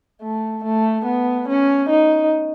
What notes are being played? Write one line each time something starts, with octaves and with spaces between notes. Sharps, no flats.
A3
A3
B3
C#4
D#4